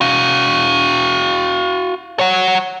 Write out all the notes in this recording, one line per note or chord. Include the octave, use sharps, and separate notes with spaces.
F#4 F5
C#5 F#5